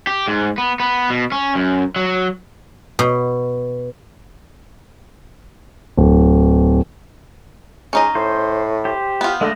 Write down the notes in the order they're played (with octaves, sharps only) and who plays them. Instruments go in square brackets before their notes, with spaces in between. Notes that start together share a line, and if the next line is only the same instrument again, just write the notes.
[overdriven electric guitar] G4
G#2
B3
B3
B2
C#4
F#2
F#3
[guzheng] B2
[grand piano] D1
[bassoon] G#3 [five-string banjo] C#4 D#4 D#5
[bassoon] A2 [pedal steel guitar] C5
[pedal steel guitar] G4 C5
[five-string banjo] B3 F4
[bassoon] D3 [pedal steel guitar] G#3 A3 D#5